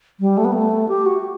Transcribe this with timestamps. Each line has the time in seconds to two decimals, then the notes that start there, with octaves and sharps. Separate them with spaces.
0.20 G3
0.37 A3
0.45 B3
0.52 A3
0.89 G4
1.06 F#4